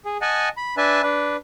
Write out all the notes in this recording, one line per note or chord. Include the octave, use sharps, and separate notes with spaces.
G#4
D#5 F#5 G#5 A5
B5
D4 B4 E5 G#5 A5
D4 B4